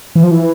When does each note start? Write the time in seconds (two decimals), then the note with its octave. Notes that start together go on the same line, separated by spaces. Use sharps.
0.16 E3
0.23 F3
0.31 E3